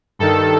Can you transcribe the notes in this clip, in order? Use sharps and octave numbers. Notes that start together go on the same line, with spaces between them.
G2 D#3 A4